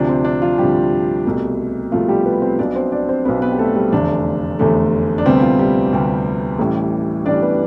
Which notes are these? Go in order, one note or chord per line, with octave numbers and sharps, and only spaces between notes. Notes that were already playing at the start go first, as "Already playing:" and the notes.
Already playing: D2 C3 F3 D4
C4
D4
F3 F4
D2 C3 F3 G3 G4
C2 B2 A3
C2 B2 F3 A3 F4
G3 G4
B3 B4
C4 C5
B1 B2 B3 D4 D5
C4 C5
D4 D5
C4 C5
B1 B2 B3 B4
B3 B4
G4
A3 A4
G3 G4
F1 E2 D3 A3 D4
F1 E2 D3 A3
D4
D2 C3 G3 B3 C4
F3 F4
G3 G4
D2 C3 G3 B3
A1 A2 E3 G3
A1 A2 E3 G3 D4 D5
B3 B4